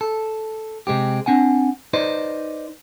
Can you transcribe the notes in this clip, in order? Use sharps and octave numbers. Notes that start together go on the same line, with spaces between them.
A4
C3 G#3 C4 G4
C4 D4 F#5 G#5
D#4 B4 C5 D5 D#5